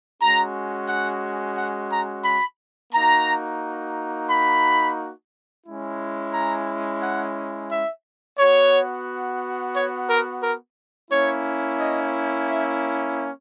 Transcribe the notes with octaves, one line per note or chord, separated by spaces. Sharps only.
G#3 C#4 F#4 A#5
F#5
F#5
A#5
B5
A#3 D#4 F#4 A#5
B5
G#3 C#4 E4
A#5
F#5
E5
B3 F#4 C#5
C#5
A#4
A#4
A#3 C#4 E4 C#5
D#5
E5